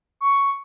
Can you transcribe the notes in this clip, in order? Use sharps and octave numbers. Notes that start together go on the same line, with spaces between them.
C#6